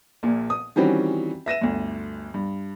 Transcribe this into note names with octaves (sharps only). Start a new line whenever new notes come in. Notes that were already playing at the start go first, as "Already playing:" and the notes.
A#1 A#2
D#6
D#3 E3 G3 C4 C#4 F#4
E5 A#6 D#7 E7
G1 D2
G2